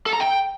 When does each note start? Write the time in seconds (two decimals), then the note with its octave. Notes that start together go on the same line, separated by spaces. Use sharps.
0.06 A4
0.13 A#5
0.20 G5